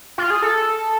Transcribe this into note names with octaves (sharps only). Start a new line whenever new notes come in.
F4
G#4
A4